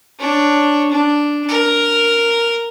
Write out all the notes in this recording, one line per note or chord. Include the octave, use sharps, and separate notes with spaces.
D4 C#5
D4
A#4